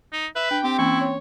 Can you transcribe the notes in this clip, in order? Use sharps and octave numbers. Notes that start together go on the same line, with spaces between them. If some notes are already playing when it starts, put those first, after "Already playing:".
D#4
B4 E5
D4 G5
C4 G4
E3 A#3 C#4 E4 C#6
C#5